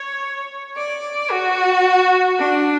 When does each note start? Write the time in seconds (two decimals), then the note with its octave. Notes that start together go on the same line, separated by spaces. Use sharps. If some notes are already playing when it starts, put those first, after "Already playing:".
Already playing: C#5
0.77 D5
1.32 F#4
2.40 D4